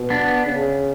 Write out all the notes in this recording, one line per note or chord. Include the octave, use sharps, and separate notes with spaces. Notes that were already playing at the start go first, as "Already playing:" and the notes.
Already playing: B2
B3 D4
C#3